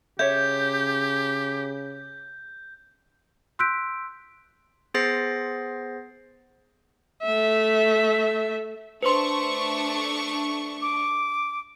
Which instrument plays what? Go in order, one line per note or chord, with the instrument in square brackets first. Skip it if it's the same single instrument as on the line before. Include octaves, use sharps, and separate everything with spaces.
[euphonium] C#3 [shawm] G4 [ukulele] C#5 E5 [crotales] G6
[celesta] C6 E6 F#6 G6 B6 D7
[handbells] B3 G#4 C5 A6 A#6 C7
[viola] A3 E5
[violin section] A3 D4 C#6 [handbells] B4 C5 C6
[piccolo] D6